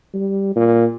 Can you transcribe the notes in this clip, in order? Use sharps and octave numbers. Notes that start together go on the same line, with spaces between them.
G3
A#2